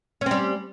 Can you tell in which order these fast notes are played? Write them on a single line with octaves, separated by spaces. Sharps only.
C#4 C4 G3